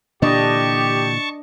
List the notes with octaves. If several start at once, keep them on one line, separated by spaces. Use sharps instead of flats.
A#2 D3 E3 D4 G4 D#5 A5 C#6